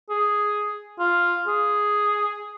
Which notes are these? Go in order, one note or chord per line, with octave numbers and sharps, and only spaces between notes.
G#4
F4
G#4